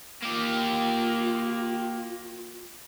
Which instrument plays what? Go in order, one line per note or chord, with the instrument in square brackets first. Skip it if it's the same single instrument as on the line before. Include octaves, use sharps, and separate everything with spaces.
[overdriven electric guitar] A#3 G4 [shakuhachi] F4